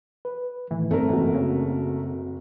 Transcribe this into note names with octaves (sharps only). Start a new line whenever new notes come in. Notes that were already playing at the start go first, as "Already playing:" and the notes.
B4
A2 D#3 E3 A3
G2 A3 C4 A#4
F#1 E3 F#4
C#3